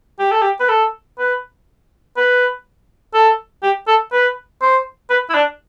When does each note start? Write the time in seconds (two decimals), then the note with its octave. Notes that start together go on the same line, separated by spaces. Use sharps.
0.19 G4
0.31 A4
0.42 G4
0.60 B4
0.69 A4
1.19 B4
2.17 B4
3.14 A4
3.63 G4
3.87 A4
4.12 B4
4.62 C5
5.10 B4
5.30 E4
5.35 D4